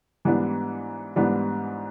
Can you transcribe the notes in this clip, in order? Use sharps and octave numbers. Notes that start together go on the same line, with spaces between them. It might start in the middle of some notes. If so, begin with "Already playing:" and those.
G#2 E3 G3 B3 D4
G#2 E3 G3 B3 D4